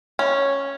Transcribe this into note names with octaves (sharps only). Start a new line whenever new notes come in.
C#4